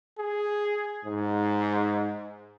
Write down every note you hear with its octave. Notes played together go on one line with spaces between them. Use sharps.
G#4
G#2